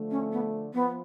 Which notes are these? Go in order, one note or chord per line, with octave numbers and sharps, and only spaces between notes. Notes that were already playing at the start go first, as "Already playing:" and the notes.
Already playing: D3 F3 A3
C#4
B3
F3 B3